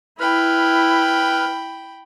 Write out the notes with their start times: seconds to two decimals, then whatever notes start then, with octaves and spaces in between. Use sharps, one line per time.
0.20 E4 B4 G5 B5 F6